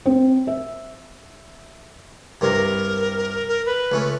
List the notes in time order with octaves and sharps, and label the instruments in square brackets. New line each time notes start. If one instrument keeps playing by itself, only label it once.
[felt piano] C4
E5
[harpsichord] C2 G2 C3 [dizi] A#4
[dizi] A#4
B4
[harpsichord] C#2 A3 C#4